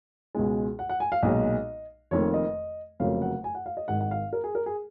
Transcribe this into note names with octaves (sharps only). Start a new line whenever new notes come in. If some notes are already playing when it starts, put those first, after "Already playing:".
C#2 B2 G#3
F#5
F#5
G#5
F5
B1 A#2 G#3 D#5
F1 F2 D#3 A#3 C#5
D#5
F1 F2 C#3 F#3 A#3 F5
F#5
G#5
F#5
F5
D#5
G#1 G#2 D#3 F#5
F#5
F5
A#4
G#4
A#4
G#4